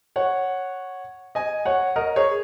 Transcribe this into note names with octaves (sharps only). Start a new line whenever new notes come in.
C#5 F#5
D#5 G#5
C#5 F#5
A#4 D#5
G#4 C#5